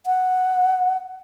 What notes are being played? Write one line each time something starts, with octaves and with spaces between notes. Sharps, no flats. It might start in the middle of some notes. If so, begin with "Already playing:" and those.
F#5